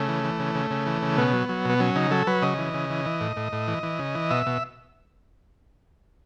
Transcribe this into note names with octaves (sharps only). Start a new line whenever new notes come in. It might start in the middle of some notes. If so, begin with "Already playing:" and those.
Already playing: C#3 A3
E3
E3
C#3
C#3
C#3
E3
C#3
B2 B3
F#3
F#3
B2 B3
F#3 C#4
C#3 D#4
F#3 A4
F#3 B4
C#3 D#5
E3
C#3
E3
E3
A2
A2
A2
E3
E3
C#3
E3
B2 E5
B2